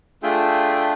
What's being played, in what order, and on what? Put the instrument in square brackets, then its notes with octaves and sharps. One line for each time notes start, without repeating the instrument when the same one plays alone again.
[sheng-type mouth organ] A3 D4 F4 G#4 E5 G5